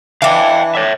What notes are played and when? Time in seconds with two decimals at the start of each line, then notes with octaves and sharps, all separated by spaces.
0.22 E3 D4 F5 G5
0.75 C#5 E5